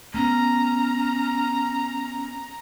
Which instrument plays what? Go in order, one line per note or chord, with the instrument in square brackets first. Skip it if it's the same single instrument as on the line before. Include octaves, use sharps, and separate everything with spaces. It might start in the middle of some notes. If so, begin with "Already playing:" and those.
[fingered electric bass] A3 B3 [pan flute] C#4 [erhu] A#5